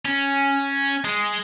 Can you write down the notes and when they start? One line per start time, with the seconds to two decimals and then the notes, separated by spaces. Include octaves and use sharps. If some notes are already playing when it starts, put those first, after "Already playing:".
0.05 C#4
1.04 G#3